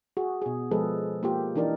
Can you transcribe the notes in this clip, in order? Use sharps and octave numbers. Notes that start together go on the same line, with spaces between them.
F#4 G#4
B2 G#4
F3 G#3 G#4 A4 B4
A#3 F4 G4
E3 D4 D#4 A#4 D5